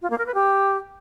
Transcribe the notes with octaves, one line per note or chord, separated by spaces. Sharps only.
F4
A#3
A#4
B4
G4